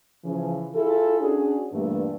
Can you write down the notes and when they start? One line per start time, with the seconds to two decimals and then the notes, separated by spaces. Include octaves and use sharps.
0.24 C#3 E3 F3
0.74 E4 F4 G#4 A4
1.19 C#4 D4 F#4 G#4
1.72 G2 A#2 E3 G3 A3 B3